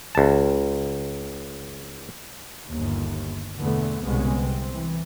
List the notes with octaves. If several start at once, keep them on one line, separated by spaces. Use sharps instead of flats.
C#2 A5
G1 D#2
E2 B2 D3 A3 B3
C2 B2 D3 G#3 B3 C#4
C3 C4
E3